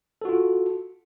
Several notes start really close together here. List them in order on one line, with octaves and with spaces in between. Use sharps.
A4 F#4 F4